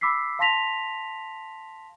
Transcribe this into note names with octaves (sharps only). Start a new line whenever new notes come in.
B5 D6 E6 B6 C7
F5 A5 C6 A#6 B6 F7